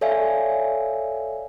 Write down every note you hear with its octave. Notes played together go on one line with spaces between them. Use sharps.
A4 C#5 D5 E5 F5 G#5